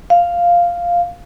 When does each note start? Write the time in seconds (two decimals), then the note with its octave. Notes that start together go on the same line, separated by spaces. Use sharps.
0.10 F5